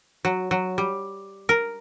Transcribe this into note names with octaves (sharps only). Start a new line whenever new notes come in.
F#3
F#3
G3
A#4